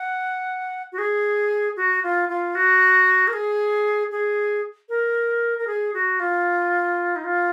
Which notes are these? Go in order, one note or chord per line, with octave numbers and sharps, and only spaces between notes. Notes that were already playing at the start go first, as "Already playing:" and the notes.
Already playing: F#5
F#4
G#4
F#4
F4
F4
F#4
A#4
G#4
G#4
A#4
A#4
G#4
F#4
F4
D#4
F4